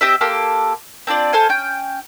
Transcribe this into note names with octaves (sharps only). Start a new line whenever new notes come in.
C4 G4 D#5 E5
A#3 G4 A4 C6
C4 D4 F4 D5
A4 C5 F5 G#5
C#4 G5